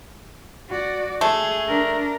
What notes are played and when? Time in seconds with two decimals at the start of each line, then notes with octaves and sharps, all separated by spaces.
0.70 F#4 D5
1.21 A3 G#4
1.68 D4 A#4